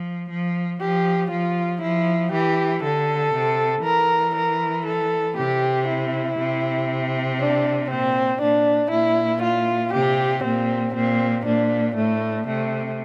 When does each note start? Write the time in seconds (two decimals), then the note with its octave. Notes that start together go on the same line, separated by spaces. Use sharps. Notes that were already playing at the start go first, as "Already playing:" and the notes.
Already playing: F3
0.29 F3
0.80 F3 G4
1.31 F3 F4
1.82 F3 E4
2.32 E3 G4
2.83 D3 A4
3.34 C3
3.84 E3 A#4
4.36 A#4
4.86 A4
5.37 C3 G4
5.88 E4
6.38 C3
7.40 D4
7.90 A#2 C4
8.41 A#2 D4
8.92 A#2 E4
9.42 F4
9.93 C3 G4
10.44 A#2 C4
10.95 A#2 C4
11.46 A#2 D4
11.96 A2 A3
12.47 C3 A3